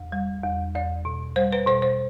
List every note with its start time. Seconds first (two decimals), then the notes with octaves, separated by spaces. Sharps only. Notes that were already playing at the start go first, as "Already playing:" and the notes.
Already playing: E2
0.12 G3
0.43 E2
0.75 E2 D5
1.05 B2
1.36 G3 C5
1.53 B4
1.67 B2 C5
1.82 C5